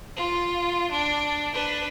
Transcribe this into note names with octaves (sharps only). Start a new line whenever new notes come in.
F4
D4
D4 B4